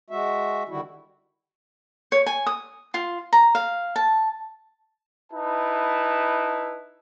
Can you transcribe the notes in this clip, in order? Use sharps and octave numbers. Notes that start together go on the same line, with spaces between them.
G#3 F#4 E5
D3 D#3 G3 E4 F#4
C#5
G#5
D#6
F4
A#5
F5
A5
D#4 E4 B4 A5